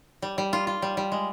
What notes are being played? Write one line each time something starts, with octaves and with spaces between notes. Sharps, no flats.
G3
G3
F4
F4
G3
G3
G#3